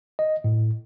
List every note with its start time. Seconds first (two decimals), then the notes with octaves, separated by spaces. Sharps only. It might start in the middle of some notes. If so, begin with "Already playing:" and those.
0.19 D#5
0.44 A2